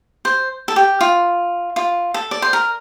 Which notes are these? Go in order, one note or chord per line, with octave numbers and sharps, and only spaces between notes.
C5
A4
G4
F4
F4
A4
D5
C5
A#4